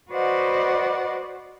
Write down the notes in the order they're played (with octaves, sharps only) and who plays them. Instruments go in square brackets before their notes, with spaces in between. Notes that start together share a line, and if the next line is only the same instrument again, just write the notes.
[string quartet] F#4 B4 C5 D5 D#5 F#5